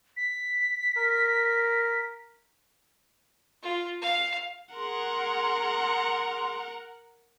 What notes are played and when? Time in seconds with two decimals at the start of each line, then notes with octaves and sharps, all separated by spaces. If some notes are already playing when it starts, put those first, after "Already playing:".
0.17 B6
0.97 A#4
3.63 F4
4.02 F5
4.75 G#4 A#4 F#5 C6